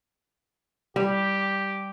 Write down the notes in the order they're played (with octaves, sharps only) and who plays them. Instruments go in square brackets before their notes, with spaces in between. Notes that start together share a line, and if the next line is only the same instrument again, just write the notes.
[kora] G3 [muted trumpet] G4